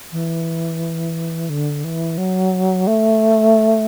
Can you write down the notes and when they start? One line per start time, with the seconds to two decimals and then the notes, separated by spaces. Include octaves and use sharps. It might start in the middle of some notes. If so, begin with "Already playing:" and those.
0.12 E3
1.49 D3
1.84 E3
2.18 F#3
2.87 A3